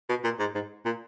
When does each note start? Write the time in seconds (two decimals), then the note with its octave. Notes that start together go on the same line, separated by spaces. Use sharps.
0.09 B2
0.24 A#2
0.40 G#2
0.55 G#2
0.86 A#2